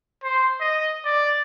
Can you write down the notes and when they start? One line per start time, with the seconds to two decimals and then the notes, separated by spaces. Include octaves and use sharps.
0.23 C5
0.61 D#5
1.05 D5